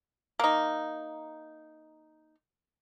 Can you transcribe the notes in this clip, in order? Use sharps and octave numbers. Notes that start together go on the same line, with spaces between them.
A#3 D#4